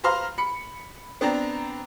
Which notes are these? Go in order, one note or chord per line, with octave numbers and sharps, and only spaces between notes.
B4 C5 F5 A#5 C6 F6
B5 C#7
B3 C4 D4 A#5